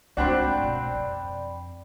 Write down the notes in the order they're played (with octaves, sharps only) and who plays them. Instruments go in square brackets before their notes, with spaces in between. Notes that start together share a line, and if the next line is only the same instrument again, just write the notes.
[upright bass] D2 G#2 [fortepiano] C4 D4 F#4 [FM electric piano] D5 G5 B5
[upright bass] B2
F2